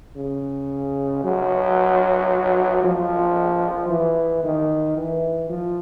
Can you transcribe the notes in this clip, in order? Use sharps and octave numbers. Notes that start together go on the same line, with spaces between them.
C#3
F#3
F3
E3
D#3
E3
F3